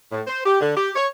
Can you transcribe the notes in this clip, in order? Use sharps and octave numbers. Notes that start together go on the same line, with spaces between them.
A2
C5
G4
D3
G4
C#5